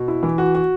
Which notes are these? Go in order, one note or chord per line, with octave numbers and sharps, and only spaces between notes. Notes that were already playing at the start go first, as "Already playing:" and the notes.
Already playing: B2
E4
E3
F#4
F#4